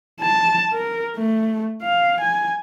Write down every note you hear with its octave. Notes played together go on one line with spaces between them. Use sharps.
A5
A#4
A3
F5
G#5